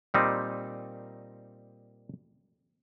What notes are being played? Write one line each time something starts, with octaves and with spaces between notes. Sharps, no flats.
A#2 G3 C4 D#4